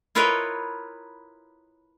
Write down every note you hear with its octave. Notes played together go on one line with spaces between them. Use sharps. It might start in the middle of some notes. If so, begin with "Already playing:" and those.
E4 F4 A#4 B4 C#5 D#5